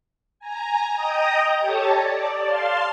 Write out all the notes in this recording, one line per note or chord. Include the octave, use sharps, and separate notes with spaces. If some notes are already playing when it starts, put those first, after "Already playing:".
G#5 A#5
D#5 G5 A#5 D#6
G4 A4 C#5 A5
D5
F5 A5 C6